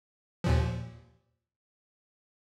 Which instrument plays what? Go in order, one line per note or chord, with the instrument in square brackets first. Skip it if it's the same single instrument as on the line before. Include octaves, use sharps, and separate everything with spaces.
[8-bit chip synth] D#2 A#2 F3